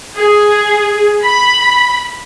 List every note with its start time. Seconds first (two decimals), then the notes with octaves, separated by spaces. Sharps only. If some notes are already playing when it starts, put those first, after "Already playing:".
0.15 G#4
1.23 B5